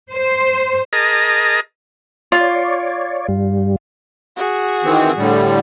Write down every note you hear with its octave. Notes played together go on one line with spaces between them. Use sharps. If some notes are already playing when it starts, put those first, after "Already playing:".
C5
G#4 A#4 D#5 A5 A#5
F4 C#5 D5
G2 G3
F#4 G#4
D#3 E3 C4
A2 D3 G3